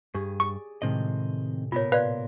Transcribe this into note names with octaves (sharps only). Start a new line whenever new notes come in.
G2 G4 G#4
D5 C#6
A2 C3 D#3 G#3 C4 D#5
A#2 B3 F4 A#4 C#5
B4 D5 F5 C6